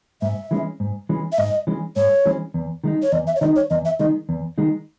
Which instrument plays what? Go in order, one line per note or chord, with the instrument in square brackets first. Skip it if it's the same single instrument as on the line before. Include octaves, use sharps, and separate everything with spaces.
[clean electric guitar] G#2 [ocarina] E5
[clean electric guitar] E3 G#3 C#4
G#2
E3 G#3 C#4
[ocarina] E5
[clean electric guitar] G#2 [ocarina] D#5
[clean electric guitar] E3 G#3 C#4
[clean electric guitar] G#2 [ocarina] C#5
[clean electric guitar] E3 G#3 C#4
E2
D#3 G#3 D#4
[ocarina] C#5
[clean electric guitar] E2 [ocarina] D#5
[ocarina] E5
C#5
[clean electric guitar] D#3 G#3 D#4 [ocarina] D#5
[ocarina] C#5
[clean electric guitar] E2 [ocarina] D#5
[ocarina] E5
[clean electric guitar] D#3 G#3 D#4 [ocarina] D#5
[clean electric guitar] E2
D#3 G#3 D#4